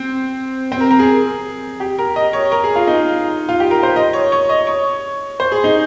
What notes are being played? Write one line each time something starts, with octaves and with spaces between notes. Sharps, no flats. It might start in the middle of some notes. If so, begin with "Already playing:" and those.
Already playing: C4
C4
A#4
A#4
G#4
G4
A#4
D#5
C#5
A#4
G#4
F4
D#4
F4
G4
A#4
C5
D#5
C#5
C#5
D#5
C#5
C5
G#4
D#4